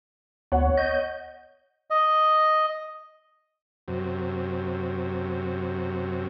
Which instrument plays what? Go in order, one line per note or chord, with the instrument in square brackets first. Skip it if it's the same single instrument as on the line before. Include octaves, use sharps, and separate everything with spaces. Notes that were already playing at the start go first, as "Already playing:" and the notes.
[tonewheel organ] D2 B3 [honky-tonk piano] C#5 F#5
[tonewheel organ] D#5 G6
[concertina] D#5
[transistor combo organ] F#2 C3